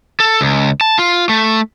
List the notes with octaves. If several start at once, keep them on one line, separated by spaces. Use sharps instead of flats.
A4
C#2
A5
F4
A3